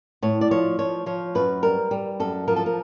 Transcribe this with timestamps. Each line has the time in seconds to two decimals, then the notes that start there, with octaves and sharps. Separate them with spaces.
0.22 A2 C#5
0.41 D5
0.51 F3 C#5
0.79 F3 C#5
1.06 F3 C#5
1.35 F#2 B4
1.63 G3 A#4
1.91 G3
2.20 F#2 A4
2.48 F3 A#4
2.56 A4
2.66 A#4